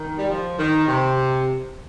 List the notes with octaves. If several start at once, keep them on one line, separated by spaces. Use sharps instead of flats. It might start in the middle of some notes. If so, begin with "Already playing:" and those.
Already playing: D#3
G3
F3
D#3
C3